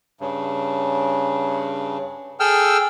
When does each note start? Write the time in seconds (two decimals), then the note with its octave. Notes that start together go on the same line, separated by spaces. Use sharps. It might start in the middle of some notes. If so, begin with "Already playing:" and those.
0.21 G2 C#3
2.40 G#4 A4 G5 E6 F6